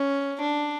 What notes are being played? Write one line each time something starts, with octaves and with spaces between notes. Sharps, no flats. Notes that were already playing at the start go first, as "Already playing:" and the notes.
Already playing: C#4
D4